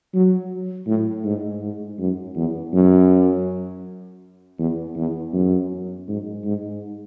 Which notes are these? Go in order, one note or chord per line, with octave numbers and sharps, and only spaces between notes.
F#3
A2
G#2
G#2
F#2
E2
F#2
E2
E2
F#2
G#2
G#2